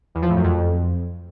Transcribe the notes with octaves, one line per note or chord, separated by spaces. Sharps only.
E2
F3
A2
F#2
F2